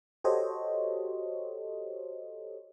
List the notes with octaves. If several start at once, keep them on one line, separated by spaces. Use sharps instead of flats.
F#4 G4 A4 C5 C#5 D#5